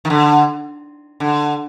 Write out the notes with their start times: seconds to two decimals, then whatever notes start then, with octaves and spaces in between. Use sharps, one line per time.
0.05 D#3
0.10 D3
1.20 D3